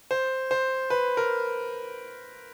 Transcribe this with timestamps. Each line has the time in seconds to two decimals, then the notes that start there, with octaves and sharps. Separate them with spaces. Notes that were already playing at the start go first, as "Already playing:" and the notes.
0.11 C5
0.51 C5
0.90 B4
1.17 A#4